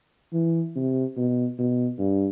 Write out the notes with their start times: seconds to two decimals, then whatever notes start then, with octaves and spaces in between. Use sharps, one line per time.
0.33 E3
0.75 C3
1.17 B2
1.58 B2
1.99 G2